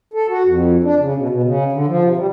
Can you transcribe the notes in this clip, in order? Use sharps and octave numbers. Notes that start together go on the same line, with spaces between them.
A4
F#4
F2
D4
C#3
B2
B2
C#3
D3
F3
C3
G3